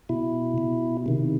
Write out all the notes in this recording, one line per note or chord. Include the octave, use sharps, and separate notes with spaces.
B2 E4
B2
C3 D#3